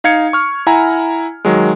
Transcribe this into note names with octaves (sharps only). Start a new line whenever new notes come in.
D#4 F5 G#6 C#7
C#6 F6
E4 F#5 G#5 A#5
D#3 F#3 G#3